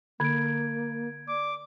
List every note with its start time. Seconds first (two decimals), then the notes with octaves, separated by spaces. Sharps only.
0.20 D3 A#3 G#6 D7
1.28 D5 D6